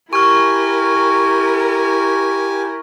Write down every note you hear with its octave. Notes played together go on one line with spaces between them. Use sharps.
E4 G4 A#4 G#5 C#6 F6